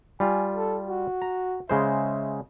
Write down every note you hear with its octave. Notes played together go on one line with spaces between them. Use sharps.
G3 F4 G#5
A4
F#4
A#5
C#3 G#3 C5 E5